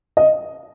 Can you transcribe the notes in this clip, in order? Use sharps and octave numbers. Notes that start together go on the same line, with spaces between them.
D#5